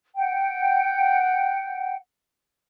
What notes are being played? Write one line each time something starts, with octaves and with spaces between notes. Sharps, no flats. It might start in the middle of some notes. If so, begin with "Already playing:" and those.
F#5 G5